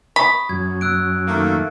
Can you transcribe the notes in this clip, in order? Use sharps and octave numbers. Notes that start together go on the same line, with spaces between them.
B5 C#6 D#6
F#2 G#6
E6 F#6 D7
D#3 A3 A#3